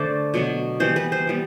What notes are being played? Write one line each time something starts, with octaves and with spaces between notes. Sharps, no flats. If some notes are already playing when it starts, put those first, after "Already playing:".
Already playing: D3 A3 C5 D5
B2 F#3 B3
E3 G3 B3 C5
B4
C5
E3 G3 B3